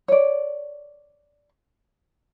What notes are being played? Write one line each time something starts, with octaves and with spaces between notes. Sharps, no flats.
C#5 D5